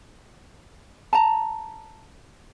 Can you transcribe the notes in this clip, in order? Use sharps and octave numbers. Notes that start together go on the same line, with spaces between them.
A5 A#5